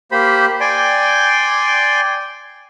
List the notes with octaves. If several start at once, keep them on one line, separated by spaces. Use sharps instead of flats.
A#3 G4 C5 B5
D5 G5 G#5 C6